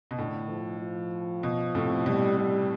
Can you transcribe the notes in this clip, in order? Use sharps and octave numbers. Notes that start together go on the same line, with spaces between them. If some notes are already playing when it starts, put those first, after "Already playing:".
B2
A2 D3
F3
F3
B2
A2 C3
B2 G3
B2 G3